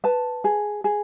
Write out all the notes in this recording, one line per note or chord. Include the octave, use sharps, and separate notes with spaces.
B4 A5
G#4
G#4